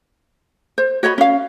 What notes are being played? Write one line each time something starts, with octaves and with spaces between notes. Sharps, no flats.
C5
F#4 C#5 D#5 B5
C#4 F5